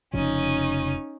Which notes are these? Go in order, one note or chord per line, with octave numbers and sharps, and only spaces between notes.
F1 C#3 F3 C#4 D#4